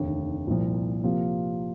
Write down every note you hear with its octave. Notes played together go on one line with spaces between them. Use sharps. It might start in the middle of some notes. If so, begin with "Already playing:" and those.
Already playing: F1 D#2 D3
C2 A#2 F3
C3 F3 A#3 F4